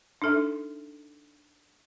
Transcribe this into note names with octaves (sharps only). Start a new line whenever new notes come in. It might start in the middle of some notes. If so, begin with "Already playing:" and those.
D4 D#4 A4 E5